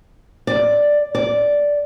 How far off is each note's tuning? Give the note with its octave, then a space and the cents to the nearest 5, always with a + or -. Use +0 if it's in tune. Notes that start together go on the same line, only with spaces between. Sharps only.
D5 +5
D5 -5